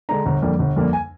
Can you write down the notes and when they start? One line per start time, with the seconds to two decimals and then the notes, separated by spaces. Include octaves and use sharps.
0.09 D3 G#3 D4 A#5
0.26 G1
0.42 F2 D3 G3 A#3
0.59 G1
0.76 F2 D3 G3 A#3
0.93 G#5